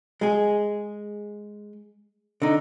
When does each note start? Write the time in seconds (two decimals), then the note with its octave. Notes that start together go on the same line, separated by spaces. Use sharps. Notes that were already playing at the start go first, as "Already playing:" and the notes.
0.21 G#3 G#4
2.42 D3 D#4